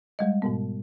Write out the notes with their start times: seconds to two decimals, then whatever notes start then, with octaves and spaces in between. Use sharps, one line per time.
0.19 G3 G#3 D#5
0.42 G#2 B2 B3